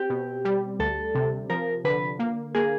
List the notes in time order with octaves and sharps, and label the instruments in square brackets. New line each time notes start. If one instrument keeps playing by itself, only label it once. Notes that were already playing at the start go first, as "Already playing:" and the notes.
Already playing: [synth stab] C4 [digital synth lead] G4
[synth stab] B2
G3
[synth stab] D2 [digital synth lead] A4
[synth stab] C3
[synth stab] F3 [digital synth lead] A#4
[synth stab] D3 [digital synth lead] B4
[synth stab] A#3
[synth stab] A#3 [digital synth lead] G#4